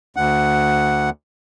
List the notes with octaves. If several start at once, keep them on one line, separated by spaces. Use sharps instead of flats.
D2 F#5